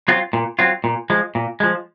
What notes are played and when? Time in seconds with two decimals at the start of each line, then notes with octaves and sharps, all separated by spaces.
0.08 F#3 C4 F4
0.33 A#2
0.59 F#3 C4 F4
0.84 A#2
1.10 F3 G#3
1.35 A#2
1.60 F3 G#3